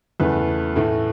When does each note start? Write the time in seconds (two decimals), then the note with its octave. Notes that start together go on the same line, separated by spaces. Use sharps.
0.20 E2 C#3 E3 A3 B4
0.76 A2 E3 A3